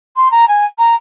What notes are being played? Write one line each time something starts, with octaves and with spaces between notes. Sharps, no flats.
C6
A#5
G#5
A#5